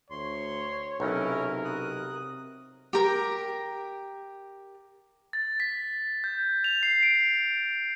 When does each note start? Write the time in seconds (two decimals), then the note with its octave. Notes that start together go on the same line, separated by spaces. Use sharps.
0.10 D2 C#5 C6
1.00 B1 C3 C#4 E4 A#4 C#5
1.65 D#6 F#6
2.93 G4 A#4
5.33 A6
5.60 B6
6.24 G6
6.64 F7
6.83 C7
7.03 D7